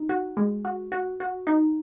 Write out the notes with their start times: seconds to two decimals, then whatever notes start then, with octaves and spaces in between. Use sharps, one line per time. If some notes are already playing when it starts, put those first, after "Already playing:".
Already playing: D#4
0.09 F#4
0.37 G#3
0.65 F#4
0.92 F#4
1.20 F#4
1.47 D#4